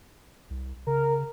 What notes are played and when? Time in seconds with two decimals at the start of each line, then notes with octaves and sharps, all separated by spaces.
0.50 C2
0.87 C#3 A#4